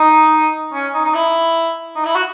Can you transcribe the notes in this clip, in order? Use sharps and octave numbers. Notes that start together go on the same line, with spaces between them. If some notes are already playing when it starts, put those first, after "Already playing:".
Already playing: D#4
C#4
D#4
D#4
E4
D#4
E4
F#4